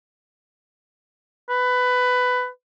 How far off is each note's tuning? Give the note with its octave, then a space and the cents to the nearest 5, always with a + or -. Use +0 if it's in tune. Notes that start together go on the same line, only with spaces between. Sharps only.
B4 +15